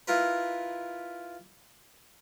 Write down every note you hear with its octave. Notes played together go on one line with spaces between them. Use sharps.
E4 F4 A#4 B4